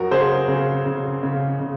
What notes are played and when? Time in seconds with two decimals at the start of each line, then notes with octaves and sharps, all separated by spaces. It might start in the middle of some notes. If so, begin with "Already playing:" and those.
Already playing: F#2 F#4 A#4
0.11 C#3 G#4 C5
0.48 C#3
0.86 C#3
1.23 C#3
1.60 C#3